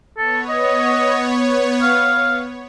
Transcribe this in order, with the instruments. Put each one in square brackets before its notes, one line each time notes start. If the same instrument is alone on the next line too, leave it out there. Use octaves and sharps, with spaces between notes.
[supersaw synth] B3 C#5 [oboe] A4
[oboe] D#5
F5